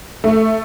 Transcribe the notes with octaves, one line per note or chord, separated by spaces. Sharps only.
A3